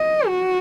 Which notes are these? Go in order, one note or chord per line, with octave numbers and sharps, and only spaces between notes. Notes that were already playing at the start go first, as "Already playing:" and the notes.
Already playing: D#5
F#4